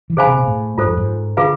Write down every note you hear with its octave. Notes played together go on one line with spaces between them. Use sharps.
E3
D3 G#4 C5 F5 G#5 B5
C3
B2
A2
G#2 F4 A4 C5
F2
G#2
D3 F4 G#4 B4 F5